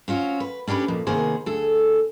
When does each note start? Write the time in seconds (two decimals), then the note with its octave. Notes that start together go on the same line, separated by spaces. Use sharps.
0.08 C4 C#4 F4 F#4
0.40 B4
0.68 C#4 D4 G4 A4 B4
0.88 F2 A#2
1.07 C3 D#3 A#3 B3 G#4 C5
1.46 D2 G#4 A4